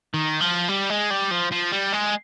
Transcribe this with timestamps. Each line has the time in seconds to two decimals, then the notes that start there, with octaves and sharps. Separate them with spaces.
0.14 D#3
0.40 F3
0.68 G3
0.90 G#3
1.10 G3
1.31 F3
1.52 F3
1.72 G3
1.93 G#3